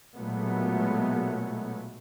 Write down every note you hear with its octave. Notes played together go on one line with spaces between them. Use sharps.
B1 A#2 F#3 G#3 A3 B3